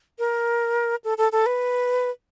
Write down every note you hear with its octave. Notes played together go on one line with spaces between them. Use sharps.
A#4
A4
A4
A4
B4